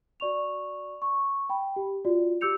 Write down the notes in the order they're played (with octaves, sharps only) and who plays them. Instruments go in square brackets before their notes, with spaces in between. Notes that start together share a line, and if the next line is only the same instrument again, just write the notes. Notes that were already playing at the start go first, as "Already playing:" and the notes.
[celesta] F#4 D5 C#6 F7
C#6
G5 B5
G4
F4 F#4 D5
G4 D6 E6 G6 C#7 F7